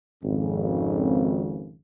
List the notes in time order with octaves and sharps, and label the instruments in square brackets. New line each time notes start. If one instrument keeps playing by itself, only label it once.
[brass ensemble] G#1 F2 C#3